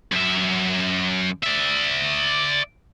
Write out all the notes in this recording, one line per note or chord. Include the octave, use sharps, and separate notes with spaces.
F#2 E5
D5 E5